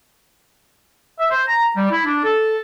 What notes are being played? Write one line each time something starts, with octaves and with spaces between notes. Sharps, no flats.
E5
C5
A#5
G3
E4
D4
A4